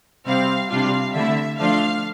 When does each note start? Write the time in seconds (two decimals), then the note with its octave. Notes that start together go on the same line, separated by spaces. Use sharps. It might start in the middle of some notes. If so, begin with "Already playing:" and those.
0.27 C3 G3 C4 F5
0.70 C3 G3 D4 F4 F5
1.14 D3 A3 E4 E5
1.58 F3 A3 D4 F4 F5